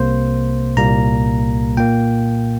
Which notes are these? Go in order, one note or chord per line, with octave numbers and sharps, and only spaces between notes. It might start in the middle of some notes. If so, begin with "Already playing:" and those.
Already playing: C2 C3 A#3 C5
C2 A#2 G3 A#3 A#5
A#2 A#3 G5